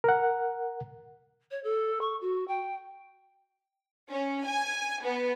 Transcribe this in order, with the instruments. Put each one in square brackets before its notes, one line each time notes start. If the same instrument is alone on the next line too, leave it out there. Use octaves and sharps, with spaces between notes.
[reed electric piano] A#4 F#5
[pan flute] C#5
A4
C#6
F#4
G5
[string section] C#4
G#5
B3